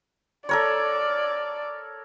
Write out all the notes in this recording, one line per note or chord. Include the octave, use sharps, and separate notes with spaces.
A4 A#4 C#5 D5